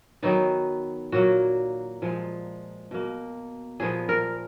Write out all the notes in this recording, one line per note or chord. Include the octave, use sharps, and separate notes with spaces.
D#3 F#3 B3 D#4
A#2 F#3 A#3 F#4
A#2 F3 G#3
B2 A#3
A#2 F3 B3 G#4
A#4